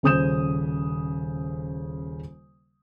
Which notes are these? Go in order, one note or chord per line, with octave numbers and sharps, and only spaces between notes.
D#1 C#3 C5 D#6 G6 E7